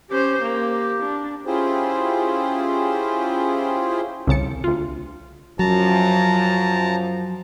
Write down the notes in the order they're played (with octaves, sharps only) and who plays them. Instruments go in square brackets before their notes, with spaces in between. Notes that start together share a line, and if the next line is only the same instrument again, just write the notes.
[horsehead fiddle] C#4 C5 [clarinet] G4
[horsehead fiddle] A#3
D4
[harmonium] C#4 E4 F4 G4 G#4 C5
[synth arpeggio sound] C2 C#3 A5 C#7
D2 F4
[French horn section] F#2 F3 [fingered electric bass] F#3 [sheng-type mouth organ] A5 A#5